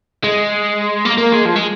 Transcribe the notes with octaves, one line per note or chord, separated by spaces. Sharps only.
G#3
A#3
A#3
G#3
F3
G#3